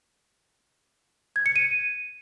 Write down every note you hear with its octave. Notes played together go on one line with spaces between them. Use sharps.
G#6
C#7
D#7